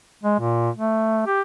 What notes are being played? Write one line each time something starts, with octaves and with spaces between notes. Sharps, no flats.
G#3
A#2
A3
G4